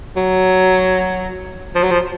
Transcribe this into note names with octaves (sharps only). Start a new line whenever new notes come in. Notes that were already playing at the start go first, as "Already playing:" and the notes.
F#3
F3
F#3
F3